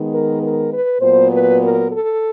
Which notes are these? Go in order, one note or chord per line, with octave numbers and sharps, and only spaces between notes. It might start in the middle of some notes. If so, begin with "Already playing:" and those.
Already playing: D#3 G#3 B3
A#4
A#4
B4
A#2 F#3 B3 C5
B4
A#4
A4